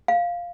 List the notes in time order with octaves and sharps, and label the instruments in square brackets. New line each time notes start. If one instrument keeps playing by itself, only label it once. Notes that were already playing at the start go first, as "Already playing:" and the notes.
[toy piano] F5